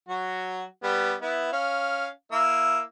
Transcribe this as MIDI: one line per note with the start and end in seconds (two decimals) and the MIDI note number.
0.09 0.64 54
0.09 0.64 66
0.83 1.14 55
0.83 1.14 59
1.22 1.50 59
1.22 1.50 64
1.53 2.08 61
1.53 2.08 77
2.32 2.80 58
2.32 2.80 64
2.32 2.80 88